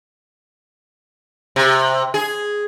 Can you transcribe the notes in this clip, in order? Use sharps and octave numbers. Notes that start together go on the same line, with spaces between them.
C3
G#4